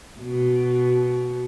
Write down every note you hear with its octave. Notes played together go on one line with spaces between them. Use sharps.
B2